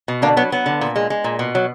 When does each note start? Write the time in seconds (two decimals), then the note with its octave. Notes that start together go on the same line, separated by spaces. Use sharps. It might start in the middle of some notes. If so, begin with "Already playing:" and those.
0.08 B2
0.22 D3 A#3 D4
0.37 F#3 B3
0.52 F#3 B3
0.66 D3
0.81 A#2
0.96 G#3
1.10 G#3
1.24 A#2
1.39 B2
1.55 F#3